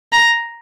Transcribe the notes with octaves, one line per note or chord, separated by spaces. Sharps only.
A#5